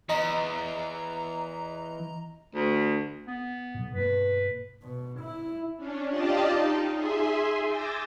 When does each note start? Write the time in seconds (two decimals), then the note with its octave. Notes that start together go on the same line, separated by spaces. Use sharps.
0.09 E2 D#5 A#5
2.55 D2
3.27 B3
3.74 B2 F#3
3.95 G2 B2 A#3 B4
4.82 B2
5.20 E4
5.77 C#4 D4
6.10 F4 G4 D5 D#5 A5
6.45 D#4
6.94 G#4 E5 G#5 C6
7.63 G#5 D6 E6 G6 A6 A#6